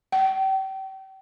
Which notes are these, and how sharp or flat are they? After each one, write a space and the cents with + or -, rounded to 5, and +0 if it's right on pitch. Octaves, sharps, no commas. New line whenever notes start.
G5 -35